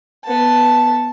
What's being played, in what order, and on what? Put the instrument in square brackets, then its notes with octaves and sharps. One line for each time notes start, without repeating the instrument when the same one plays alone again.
[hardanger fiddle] B3 A5